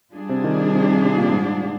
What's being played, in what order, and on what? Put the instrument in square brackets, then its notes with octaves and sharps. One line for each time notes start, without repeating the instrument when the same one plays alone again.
[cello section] G3 D4 F4 G#4
[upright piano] C3
D#3
C3
C3
C3
A#2
G#2